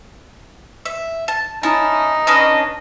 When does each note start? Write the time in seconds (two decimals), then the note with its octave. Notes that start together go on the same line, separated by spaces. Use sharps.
0.85 E5
1.28 A5
1.63 C#4 D#4 E4 A5
2.27 C#4 D4 B4 D#5